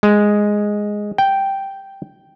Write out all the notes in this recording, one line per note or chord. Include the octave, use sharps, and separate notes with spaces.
G#3
G5